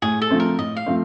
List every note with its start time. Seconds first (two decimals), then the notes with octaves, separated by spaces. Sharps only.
0.02 A2 G#4
0.22 A4
0.30 F3 A3 C4
0.40 A#4
0.58 A2 D#5
0.77 F5
0.86 F3 A3 C4